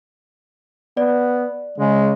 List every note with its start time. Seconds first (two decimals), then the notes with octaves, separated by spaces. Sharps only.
0.97 B3 D5
1.78 C#3 G#3